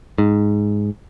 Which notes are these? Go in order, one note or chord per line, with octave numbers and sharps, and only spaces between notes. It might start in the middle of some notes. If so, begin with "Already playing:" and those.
G#2